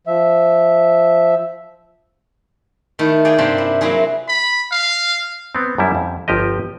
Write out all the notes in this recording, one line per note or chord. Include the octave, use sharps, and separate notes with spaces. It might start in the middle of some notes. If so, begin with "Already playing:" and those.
F3 E5
D#3 A3 E4
G#4 D5 F5 G5 G#5
G2 C3 G3 A#3 C4
E4
F#3 A#3 C4 E4 G#4
B5
F5
B3 C4
F#2 G3 E4
F2
G1 F3 G4 D#5